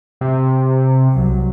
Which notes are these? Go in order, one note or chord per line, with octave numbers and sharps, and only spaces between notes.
C3
C2 F#3